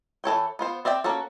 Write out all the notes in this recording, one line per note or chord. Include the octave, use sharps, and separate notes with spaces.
E3 A4 C#5 G5
B3 F4 C5
C4 D5 E5 G5
A#3 C#4 F#4 A4